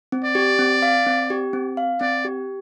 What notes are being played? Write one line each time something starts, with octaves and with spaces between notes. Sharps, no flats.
C4
D5
G4
C4
F5
C4
G4
C4
F5
C4 D5
G4